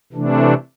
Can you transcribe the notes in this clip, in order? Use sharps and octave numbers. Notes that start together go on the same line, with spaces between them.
C3 E3 A3 D4